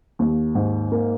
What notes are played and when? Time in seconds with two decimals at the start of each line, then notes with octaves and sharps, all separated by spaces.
0.19 D#2
0.55 G#2
0.92 A#3